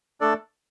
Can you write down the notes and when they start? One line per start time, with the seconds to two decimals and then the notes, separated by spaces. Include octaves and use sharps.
0.21 A3 D4 A4 D5